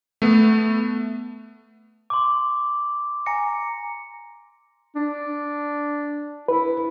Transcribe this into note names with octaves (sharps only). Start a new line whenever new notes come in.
A3 B3
C6 D6
G#5 A#5 A#6 C#7
D4
E4 B4